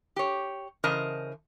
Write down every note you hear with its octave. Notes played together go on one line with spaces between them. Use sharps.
G4 C#5
C#3 E3 A#4 C5 D#5 A5